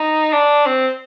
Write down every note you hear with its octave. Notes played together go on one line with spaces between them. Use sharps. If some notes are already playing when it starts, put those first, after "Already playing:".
Already playing: D#4
D4
C4